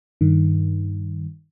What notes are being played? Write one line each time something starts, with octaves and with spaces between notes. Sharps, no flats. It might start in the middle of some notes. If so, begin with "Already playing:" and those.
G2 D#3